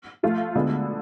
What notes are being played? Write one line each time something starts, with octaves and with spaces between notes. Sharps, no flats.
F3 A3 F4
D2 D3 G#3 B3